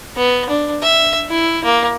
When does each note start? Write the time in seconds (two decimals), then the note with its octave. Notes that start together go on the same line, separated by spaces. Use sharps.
0.17 B3
0.50 D4
0.83 E5
1.29 E4
1.65 A#3